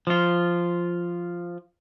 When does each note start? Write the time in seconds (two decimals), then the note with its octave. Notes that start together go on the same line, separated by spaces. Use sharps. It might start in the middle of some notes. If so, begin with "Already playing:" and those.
0.07 F3 F4